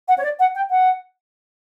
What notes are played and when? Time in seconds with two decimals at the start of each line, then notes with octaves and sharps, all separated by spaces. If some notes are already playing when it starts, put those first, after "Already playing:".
0.08 F#5
0.18 C#5
0.23 D5
0.39 F#5
0.55 G5
0.70 F#5